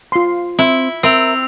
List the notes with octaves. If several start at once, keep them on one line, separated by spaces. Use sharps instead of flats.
F4 C6
C4 E4
C4 A#4 E5 E6 F7